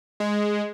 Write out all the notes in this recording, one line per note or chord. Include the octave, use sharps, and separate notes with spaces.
G#3